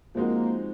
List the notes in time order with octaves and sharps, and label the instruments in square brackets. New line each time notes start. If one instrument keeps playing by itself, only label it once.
[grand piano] F3 G#3 C4 D#4 F#4 [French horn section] A#3